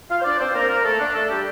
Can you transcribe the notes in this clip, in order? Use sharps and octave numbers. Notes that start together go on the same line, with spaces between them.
F4 F5
C5
D4 D5
C4 C5
A#3 A#4
A#3 A#4
A3 A4
D4
A3 A4
G3 G4